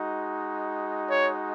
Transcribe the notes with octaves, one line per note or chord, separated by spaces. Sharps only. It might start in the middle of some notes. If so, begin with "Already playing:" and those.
Already playing: G#3 D#4 F#4
C#5